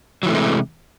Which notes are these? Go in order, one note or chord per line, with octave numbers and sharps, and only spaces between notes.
C3 E3 F#3 G#3 A3